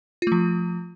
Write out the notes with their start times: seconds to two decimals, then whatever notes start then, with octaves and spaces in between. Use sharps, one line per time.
0.22 F4
0.27 A3
0.32 F3